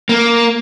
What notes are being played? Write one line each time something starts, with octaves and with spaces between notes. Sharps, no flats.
A#3